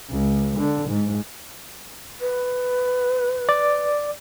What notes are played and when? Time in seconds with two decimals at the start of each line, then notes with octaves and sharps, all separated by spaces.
0.10 C#2
0.59 D3
0.89 G#2
2.20 B4
3.49 D5